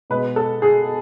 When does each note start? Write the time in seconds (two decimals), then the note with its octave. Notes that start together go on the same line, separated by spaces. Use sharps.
0.10 B2 G#3 B3 B4
0.36 A4
0.62 G#4